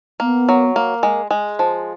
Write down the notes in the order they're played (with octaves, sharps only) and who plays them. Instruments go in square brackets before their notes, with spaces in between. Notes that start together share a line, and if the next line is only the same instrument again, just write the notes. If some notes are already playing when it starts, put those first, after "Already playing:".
[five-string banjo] A#3 [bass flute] B3
[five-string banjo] F#3
A#3
G#3
G#3
F3